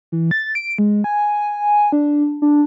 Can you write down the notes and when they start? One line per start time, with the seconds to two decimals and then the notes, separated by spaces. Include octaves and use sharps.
0.12 E3
0.31 A6
0.55 D7
0.78 G#3
1.04 G#5
1.92 D4
2.42 D4